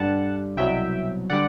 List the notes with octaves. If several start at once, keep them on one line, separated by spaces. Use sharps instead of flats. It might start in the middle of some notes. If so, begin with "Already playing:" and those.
Already playing: G2 D3 G3 F#5 A5
C2 B2 F#3 E5 G5
D3 G3 D5 F#5